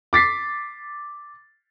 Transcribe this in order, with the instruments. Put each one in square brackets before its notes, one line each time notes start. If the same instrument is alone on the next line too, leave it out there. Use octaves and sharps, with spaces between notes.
[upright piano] D6 A6 B6 C7